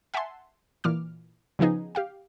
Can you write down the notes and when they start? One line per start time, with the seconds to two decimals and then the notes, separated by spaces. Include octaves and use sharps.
0.14 E5 F#5 G#5 A5 C6
0.84 A#2 E3 D6 F6
1.59 C#3 F3 B3 D#4 G#4
1.95 G4 F5 G5